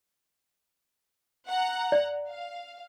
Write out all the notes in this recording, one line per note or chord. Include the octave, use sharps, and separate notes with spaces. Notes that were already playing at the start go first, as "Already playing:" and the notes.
F#5 A#5
D5
F5